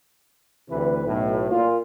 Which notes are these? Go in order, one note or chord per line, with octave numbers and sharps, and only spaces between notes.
D2 C3 E3 B4
B1 A2
A#2 F4